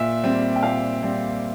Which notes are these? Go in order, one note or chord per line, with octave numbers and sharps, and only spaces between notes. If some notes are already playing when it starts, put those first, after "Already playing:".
Already playing: A#2 E5
G3 C4
G5
A#2 F5
G3 C4